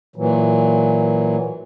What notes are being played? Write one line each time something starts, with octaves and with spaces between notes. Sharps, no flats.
A#2 E3 F#3